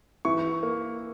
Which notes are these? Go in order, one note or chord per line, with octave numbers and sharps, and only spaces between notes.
E3 C#6
A#3